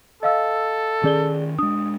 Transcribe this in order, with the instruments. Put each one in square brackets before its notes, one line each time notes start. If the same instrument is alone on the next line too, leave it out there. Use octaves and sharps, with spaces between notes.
[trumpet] A4 [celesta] D#5 F5 E6
[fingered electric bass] D#3 C#4 [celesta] G#4 D5 G7
[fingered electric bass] G#3 D4 [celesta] D#6